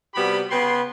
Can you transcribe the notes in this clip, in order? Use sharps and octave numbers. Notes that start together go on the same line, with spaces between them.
C3 G3 B3 F#4 G4 B5
C#3 B3 B4 G5 C6